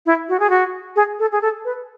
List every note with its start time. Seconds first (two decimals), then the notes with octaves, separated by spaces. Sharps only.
0.06 E4
0.29 F#4
0.40 G#4
0.50 F#4
0.96 G#4
1.19 A4
1.32 G#4
1.42 A4
1.65 B4